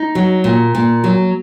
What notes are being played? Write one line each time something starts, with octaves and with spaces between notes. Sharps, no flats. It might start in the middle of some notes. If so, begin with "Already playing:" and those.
Already playing: D#4
F#3
A#2
A#2
F#3